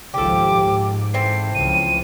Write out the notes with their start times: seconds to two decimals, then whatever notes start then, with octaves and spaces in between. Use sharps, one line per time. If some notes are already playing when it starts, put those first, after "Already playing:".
0.14 G#1 C#2 F3 G4 A4 D6
0.57 G#2
1.14 E3 A3 C4 C7
1.55 C#2 F3 D#7